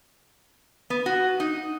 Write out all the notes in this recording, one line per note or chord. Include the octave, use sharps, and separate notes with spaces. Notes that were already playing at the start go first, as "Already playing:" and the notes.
B3
F#4
D#4